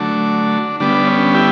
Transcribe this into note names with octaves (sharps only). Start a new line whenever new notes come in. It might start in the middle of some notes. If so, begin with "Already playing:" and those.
Already playing: D3 F#3 A3 D4
D3 G3 B3 D4
C#4
E4 G4